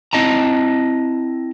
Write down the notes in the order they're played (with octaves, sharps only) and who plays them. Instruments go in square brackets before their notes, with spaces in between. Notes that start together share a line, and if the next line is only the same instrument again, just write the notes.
[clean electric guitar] C4 E4 D#5 A5 A#5